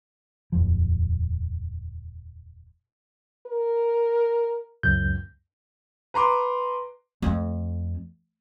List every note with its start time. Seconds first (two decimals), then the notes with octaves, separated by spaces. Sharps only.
0.52 D#1 F2 F3
3.47 A#4
4.83 C#2 F#2 G6
6.14 B4 A#5 C6 D6
7.22 F2 A3